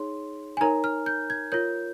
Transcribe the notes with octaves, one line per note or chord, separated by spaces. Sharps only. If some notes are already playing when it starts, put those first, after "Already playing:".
Already playing: D#4 G#4 C#5 C6
G#5
D#4 A#4 C#5 A#5
F6
G6
G#6
F4 A#4 C#5 G6